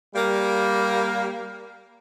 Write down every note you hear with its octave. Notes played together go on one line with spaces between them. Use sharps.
G3 A#3